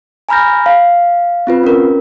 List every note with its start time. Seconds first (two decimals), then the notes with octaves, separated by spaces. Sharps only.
0.29 G#5 A#5 B5 F6 G6 A#6
0.66 F5
1.47 C4 F4 B4
1.63 C#4 A#4